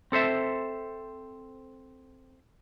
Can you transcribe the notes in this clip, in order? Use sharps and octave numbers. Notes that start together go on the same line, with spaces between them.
C4 A4 C5 E5